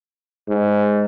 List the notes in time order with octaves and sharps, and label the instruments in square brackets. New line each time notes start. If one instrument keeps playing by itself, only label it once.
[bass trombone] G#2